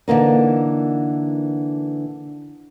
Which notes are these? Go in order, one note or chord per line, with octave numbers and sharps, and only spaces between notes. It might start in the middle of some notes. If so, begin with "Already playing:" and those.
D3 E3 A#3 D#4